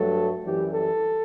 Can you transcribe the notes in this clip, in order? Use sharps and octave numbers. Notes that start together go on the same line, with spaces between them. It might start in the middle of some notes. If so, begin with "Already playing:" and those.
Already playing: G2 F#3 A3 A4
F#2 E3 G3 G4
A4